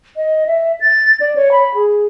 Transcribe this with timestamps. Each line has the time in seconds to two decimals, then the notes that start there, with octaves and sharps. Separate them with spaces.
0.17 D#5
0.46 E5
0.81 A6
1.20 D5
1.35 C#5
1.52 B5
1.75 G#4